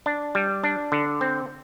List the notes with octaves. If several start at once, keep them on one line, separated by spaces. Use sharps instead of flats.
D4
G3
D4
D3
C4